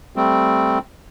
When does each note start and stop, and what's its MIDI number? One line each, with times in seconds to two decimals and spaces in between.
0.16 0.79 55
0.16 0.79 57
0.16 0.79 60